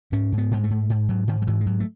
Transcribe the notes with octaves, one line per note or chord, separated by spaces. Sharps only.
G#2 C#4
G#2
B3
G#2 G#3
A3
G#2
G#2
G#2 F#3
G#2 D#3
F#3
G#2 E3
G#3
G#2 F#3
A3